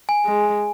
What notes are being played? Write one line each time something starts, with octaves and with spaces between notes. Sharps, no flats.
G#5
G#3